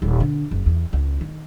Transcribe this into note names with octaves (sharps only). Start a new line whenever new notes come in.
D#1
D3
F#1
E2
C#2
D#3